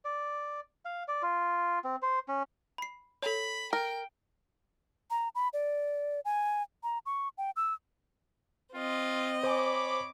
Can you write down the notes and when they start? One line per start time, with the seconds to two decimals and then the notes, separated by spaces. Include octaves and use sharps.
0.05 D5
0.85 F5
1.08 D5
1.22 F4
1.84 C4
2.02 C5
2.28 C#4
2.78 B5 C7
3.22 A4 C#5 B5
3.73 A#4 G5
5.10 A#5
5.35 B5
5.53 D5
6.25 G#5
6.83 A#5
7.06 C#6
7.38 G5
7.56 E6
8.75 C4 F4 D#5
9.44 C5 C#5 G#5 B5 D6